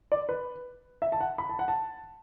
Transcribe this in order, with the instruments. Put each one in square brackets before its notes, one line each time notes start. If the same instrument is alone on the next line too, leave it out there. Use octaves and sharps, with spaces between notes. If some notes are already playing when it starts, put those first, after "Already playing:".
[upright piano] D5
B4
E5
A5
F#5
B5
A5
F#5
A5